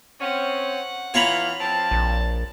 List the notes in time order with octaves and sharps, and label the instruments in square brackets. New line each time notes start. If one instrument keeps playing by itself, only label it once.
[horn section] C4 C#4 [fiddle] F#5
[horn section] E3 F4 [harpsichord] C#5 A#5 B5
[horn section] F3 C4 [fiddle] A5
[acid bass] A#1